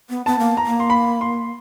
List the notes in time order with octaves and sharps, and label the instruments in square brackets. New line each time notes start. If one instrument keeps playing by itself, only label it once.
[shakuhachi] B3
[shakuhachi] B3 [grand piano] A5
[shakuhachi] A#3
[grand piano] A#5
[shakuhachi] A#3
[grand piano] C6
B5
C6